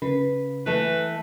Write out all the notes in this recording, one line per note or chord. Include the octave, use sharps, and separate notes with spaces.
C#3 B4
E3 A3 B4